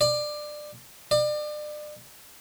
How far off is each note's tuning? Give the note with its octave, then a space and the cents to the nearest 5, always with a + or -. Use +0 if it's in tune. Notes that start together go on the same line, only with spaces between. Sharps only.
D5 +20
D5 +35